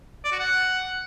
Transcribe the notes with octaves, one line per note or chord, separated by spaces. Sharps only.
D5
F#4
F#5